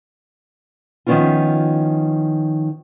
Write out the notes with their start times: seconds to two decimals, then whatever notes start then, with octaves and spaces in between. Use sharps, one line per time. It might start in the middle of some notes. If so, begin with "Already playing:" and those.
1.06 D#3 F3 B3 C#4 E4 F4